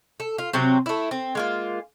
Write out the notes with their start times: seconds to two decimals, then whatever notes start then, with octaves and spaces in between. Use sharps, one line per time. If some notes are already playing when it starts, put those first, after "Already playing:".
0.20 A4
0.38 F4
0.53 C3 F#3 C4
0.86 A3 E4
1.11 C4
1.35 G#3 A#3 F4